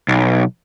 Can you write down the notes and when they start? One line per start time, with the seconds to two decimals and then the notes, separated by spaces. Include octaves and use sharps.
0.08 B1